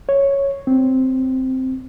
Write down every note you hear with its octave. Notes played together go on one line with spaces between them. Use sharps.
C#5
C4